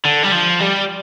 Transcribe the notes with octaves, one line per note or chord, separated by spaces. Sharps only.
D3
G3
F3
G3